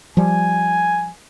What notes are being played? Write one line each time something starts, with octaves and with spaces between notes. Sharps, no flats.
F3 G3 G#5